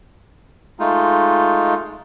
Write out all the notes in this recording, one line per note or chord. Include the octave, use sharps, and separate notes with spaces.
G#3 A3 D#4 F4